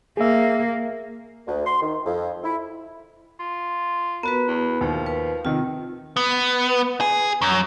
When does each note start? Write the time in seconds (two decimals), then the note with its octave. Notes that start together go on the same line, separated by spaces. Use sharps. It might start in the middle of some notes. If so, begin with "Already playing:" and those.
0.17 A#3 G#4 E5
1.47 D2
1.66 C6
1.81 D#3
2.05 F2
2.44 E4
3.39 F4
4.23 B3 F#4 A#4 B4
4.48 E2
4.81 D#2 F3
5.06 B4
5.45 C3 D#3 F4
6.17 B3
7.01 G#4
7.42 F#2